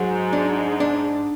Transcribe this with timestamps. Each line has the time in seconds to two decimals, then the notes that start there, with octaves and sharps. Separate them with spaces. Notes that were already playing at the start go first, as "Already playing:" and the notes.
Already playing: G#2 F#3
0.33 D4
0.80 D4